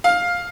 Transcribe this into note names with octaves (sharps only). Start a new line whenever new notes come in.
F5